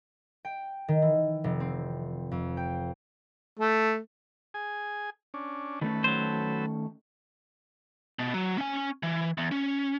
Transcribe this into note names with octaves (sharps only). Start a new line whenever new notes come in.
G5
D#3
E3
F1
C4
F2
G5
A3
G#4 G#5
C#4 D4
D#3 A3 C#4 A4 B4
F#3 C5
B2
F#3
C#4 G#5
E3
E2
C#4